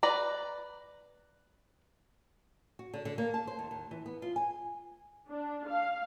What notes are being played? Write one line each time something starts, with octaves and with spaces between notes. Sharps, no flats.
B4 D5 A#5
F#4
D3
D3
A#3
A5
C5
D#2
D#2
E3
B3
F4
G#5
D4
F5